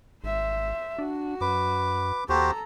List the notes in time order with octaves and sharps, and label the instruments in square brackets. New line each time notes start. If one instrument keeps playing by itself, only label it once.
[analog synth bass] G#1 [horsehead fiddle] C5 E5
[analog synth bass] D4 [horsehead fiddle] F#4
[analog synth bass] F#2 [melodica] B4 D6
[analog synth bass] D#2 [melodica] F#4 G4 C5 [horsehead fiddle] A4 A#5